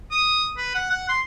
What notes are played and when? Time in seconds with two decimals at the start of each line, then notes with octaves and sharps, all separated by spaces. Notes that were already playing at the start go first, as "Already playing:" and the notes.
0.11 D#6
0.57 B4
0.74 F#5
0.91 F#5
1.09 C6